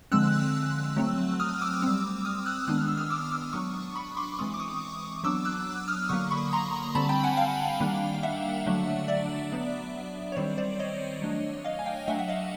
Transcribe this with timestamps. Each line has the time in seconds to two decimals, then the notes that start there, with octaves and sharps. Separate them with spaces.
0.12 D3 F3 G#3 C4 E6 F#6
0.96 F#3 A3 C4
1.40 D#6 F6
1.61 D6 E6
1.82 G3 C4
2.25 D#6 F6
2.46 E6 F#6
2.68 D#3 G#3 B3 D4 F#6
2.78 F6
2.88 E6
2.97 D#6 F6
3.10 D6 E6
3.31 D6 E6
3.53 F#3 B3 D4 C#6 D#6
3.95 B5 C#6
4.17 C6 D6
4.38 E3 G#3 C4 C#6 D#6
4.54 D6
4.60 C#6 D#6
5.24 F#3 B3 D4 D6 E6
5.45 E6 F#6
5.88 D#6 F6
6.09 D3 F#3 A#3 C#6 D#6
6.31 B5 C#6
6.53 A#5 C6
6.95 D3 G3 C4 A5 B5
7.09 G5 A5
7.24 F#5 G#5
7.37 F5 G5
7.80 D#3 G3 A#3 D4
8.14 F5
8.23 E5 F#5
8.66 D3 F#3 A3 D4
9.08 D5 E5
9.52 F#3 B3 D4
10.32 C#5
10.36 D#3 G3 C4 C5 D5
10.57 C5 D5
10.79 C#5 D#5
11.22 F#3 A3 D4
11.64 D#5 F5
11.79 G#5
11.86 F5 G5
12.08 F#3 A3 D4 E5 F#5
12.19 F#5
12.28 D#5 F5